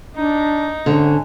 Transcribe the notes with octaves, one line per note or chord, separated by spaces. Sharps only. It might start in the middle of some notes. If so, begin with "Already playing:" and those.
D4 D#4
G#2 D3 C#4